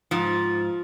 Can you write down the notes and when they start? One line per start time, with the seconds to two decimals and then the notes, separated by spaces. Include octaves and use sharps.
0.11 G#2 F3